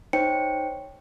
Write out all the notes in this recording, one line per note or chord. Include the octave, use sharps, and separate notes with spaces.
D#4 C5 C#5 G5 C#7